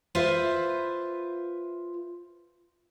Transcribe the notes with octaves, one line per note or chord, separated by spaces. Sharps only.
F4 B4 C5 E5